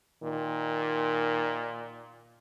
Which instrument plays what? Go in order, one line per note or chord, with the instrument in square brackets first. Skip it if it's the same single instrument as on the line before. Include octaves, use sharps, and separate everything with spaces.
[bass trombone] A#2 [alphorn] D#3